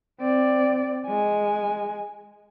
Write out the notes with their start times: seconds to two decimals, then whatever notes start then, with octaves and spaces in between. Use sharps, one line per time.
0.20 C4 D5
1.07 G#3 G#5